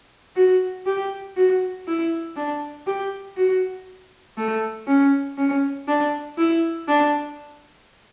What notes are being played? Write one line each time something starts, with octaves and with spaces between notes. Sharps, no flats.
F#4
G4
F#4
E4
D4
G4
F#4
A3
C#4
C#4
D4
E4
D4